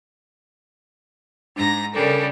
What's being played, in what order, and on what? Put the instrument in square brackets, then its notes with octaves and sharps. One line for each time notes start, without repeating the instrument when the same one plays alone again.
[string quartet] G#2 A#5 A#6 [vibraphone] D4
[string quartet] C#3 G3 D4 [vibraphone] A4 A#4